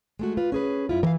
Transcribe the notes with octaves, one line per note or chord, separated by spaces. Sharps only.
G#3 A3 F#4
F4 B4
C#4 G#4 B4
F#2 E4 F4
E3 A#4 F5